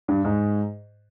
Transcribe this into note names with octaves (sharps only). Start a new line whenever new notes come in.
G2
G#2